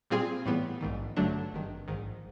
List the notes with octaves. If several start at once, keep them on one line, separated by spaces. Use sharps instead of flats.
A#2 G3 C4 F4 G#4
A2 E3 G3 B3
A#1 G#2 D#3
G2 D3 F#3 A3 D4
G#1 G2 D#3
A#1 G#2 D#3